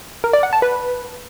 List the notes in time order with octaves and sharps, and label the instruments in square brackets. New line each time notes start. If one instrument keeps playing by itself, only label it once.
[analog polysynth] A#4
D5
F#5
A5
B4